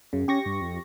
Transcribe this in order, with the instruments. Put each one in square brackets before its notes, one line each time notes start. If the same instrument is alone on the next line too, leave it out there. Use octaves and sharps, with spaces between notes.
[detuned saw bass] F#2 [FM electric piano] C#3
[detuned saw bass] C#4 [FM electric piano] G4 C#6 A#6
[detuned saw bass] G2
F2